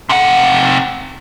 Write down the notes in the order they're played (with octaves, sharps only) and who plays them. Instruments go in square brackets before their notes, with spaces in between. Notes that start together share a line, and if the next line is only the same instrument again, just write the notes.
[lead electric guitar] C3 F#5